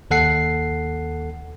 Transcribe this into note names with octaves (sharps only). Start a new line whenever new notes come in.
D#2 A4 F#5 C7